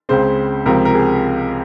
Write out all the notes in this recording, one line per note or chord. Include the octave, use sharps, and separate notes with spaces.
C#2 C#3 G#3 C4 C5
C#2 C3 F3 C4 A#4
A#4
G#4